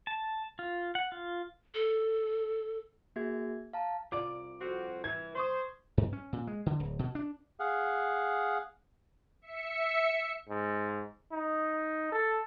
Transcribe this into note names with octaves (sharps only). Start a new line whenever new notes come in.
A5
F4
F#5
F4
A4
A#3 F#4 G#4 E5 G#6
F5 A5 A#5
C2 F4 D5 D6
F2 C4 F#4
E3 G#6
C5 C6 C#6 D#6
G2
C#4
A#2
G#3
D3
D1
B2
D4
G#4 F5 F#5
E5 C#7
G#2
D#4
A4